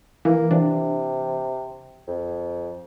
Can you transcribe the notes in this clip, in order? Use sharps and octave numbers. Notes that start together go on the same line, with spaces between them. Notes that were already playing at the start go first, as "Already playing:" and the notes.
E3 A#3
C3 E3 D4
F2